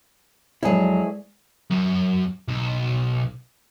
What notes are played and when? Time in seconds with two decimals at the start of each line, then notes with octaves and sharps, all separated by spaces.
0.63 F2 F#3 G#3 E4 G#4 D5
1.70 F#2
2.48 B1